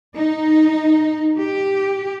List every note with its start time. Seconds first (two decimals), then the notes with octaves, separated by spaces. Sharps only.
0.16 D#4
1.38 G4